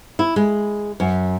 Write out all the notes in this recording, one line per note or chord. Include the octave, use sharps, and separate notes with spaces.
E4
G#3
F#2